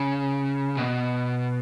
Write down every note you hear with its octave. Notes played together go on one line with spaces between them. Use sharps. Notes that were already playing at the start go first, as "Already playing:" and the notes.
Already playing: C#3
B2